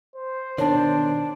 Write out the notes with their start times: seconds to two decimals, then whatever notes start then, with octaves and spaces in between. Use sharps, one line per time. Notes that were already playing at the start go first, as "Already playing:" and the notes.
0.16 C5
0.58 B2 D#3 D4 C#5 A5